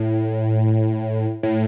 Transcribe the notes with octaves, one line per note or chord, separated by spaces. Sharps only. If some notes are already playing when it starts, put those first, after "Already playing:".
Already playing: A2
A2